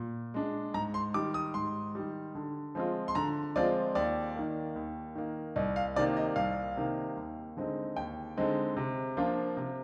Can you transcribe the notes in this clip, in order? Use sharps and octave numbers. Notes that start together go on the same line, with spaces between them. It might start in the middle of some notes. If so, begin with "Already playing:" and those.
Already playing: A#2
G#3 D4
G#2 A#5
C6
D#3 G3 D6
D#6
G#2 C6
D#3 G3
D3
F3 G#3 C4 F4
C6
D3 A#5
F3 G#3 C4 F4 D5
D#2 D5
D#3 A#3
D#2
D#3 A#3
C2 D#5
F5
C3 D#3 A#3 D5
D#5
C2 F5
C3 D#3 A#3
D#2
D3 G#3 C4 D#4
D#2 G5
D3 G#3 C4 D#4
C3
F3 A#3 D4 F4
C3